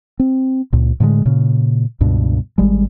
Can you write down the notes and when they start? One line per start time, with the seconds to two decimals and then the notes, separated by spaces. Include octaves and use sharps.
0.19 C4
0.73 C#2 A#2
1.00 A2 D3 F#3 G#3
1.25 A#2 C#3
2.00 C#2 G2 B2
2.58 G#1 G3 G#3